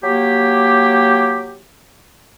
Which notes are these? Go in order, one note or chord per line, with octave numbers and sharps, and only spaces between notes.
F#3 A#3 G4